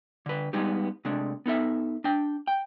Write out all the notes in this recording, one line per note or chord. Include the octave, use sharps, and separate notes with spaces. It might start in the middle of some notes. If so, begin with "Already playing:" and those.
D3 B4
G3 G#3 B3 D#4 G4
C3 G#3 A3 D4
B3 D#4 A4 E5
D4 G5
G5